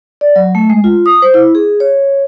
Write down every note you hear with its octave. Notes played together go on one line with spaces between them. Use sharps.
D5
F#3
A3
G#3
F4
D#6
C5
E4
G#4
C#5